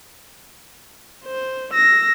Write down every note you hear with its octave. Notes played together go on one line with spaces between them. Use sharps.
C5
E6 A#6